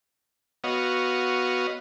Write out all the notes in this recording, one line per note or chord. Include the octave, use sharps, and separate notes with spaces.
B3 F#4 C#5 D#5 F5